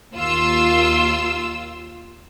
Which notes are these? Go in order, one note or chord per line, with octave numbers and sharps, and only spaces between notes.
D#2 F4 E6